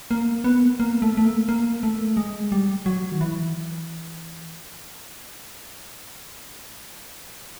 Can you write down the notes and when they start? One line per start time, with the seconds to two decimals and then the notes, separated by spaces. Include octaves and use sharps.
0.11 A#3
0.44 B3
0.80 A#3
1.02 A3
1.17 A3
1.25 A#3
1.49 A#3
1.83 A3
2.17 G#3
2.52 G3
2.86 F#3
3.12 D#3
3.21 E3